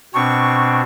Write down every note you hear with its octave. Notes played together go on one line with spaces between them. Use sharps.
B2 C4 D4 C#6